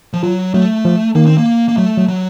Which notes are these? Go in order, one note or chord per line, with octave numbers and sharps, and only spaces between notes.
F3
F#3 F4
F#3 A3
F3
D#3 A#3
C4
A#3
A#3
F#3 A3
F#3
F#3